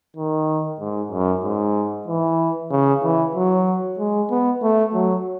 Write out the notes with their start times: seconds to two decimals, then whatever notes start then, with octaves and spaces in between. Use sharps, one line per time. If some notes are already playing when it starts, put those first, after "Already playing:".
0.16 D#3
0.80 G#2
1.11 F#2
1.44 G#2
2.08 E3
2.71 C#3
3.03 E3
3.35 F#3
3.99 G#3
4.31 B3
4.62 A3
4.94 F#3